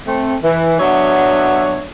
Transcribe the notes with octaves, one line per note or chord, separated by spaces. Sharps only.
A3 C4
E3
F#3 B3 D4 C#5 E5